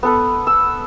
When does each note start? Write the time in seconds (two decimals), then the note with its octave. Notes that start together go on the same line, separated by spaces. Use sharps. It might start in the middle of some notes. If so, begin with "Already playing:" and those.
0.03 B3 A4 B4
0.47 E6